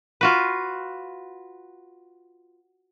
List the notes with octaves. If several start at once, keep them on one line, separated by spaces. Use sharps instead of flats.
F4 F#4 B4